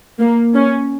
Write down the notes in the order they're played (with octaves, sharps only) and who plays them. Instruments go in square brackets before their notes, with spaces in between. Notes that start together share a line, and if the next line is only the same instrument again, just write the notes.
[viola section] A#3
C#4